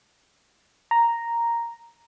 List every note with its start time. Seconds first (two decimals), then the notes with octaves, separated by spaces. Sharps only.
0.91 A#5